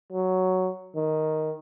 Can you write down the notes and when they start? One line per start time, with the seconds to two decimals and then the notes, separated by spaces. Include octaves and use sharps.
0.12 F#3
0.96 D#3